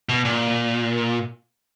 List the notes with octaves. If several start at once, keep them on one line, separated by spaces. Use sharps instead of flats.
B2
A#2